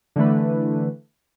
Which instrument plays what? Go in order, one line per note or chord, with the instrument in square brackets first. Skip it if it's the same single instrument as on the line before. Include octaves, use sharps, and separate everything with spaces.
[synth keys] D3 E3 A3 B4